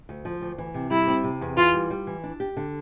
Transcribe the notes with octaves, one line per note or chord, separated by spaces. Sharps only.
D2
F3
D2
E3
C3
G3 E4
C4
C3
E2
E3 F4
G3
G3
E3
D4
G4
D3